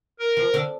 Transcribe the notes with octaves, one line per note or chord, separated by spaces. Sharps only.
A#4
F3
D3